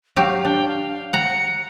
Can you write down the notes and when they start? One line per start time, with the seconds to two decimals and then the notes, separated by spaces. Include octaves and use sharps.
0.16 F#3 G4 F5
0.45 D4 G5
0.68 F5
1.13 F#5 A#5 C#7